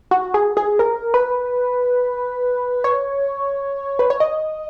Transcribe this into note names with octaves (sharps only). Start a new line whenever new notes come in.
F#4
G#4
G#4
A#4
B4
C#5
B4
C#5
D#5